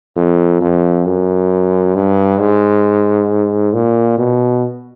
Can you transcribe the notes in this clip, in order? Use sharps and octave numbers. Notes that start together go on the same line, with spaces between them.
F2
F2
F#2
G2
G#2
A#2
B2